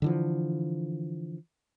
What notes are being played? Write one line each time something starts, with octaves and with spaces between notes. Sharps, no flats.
D3 E3 F3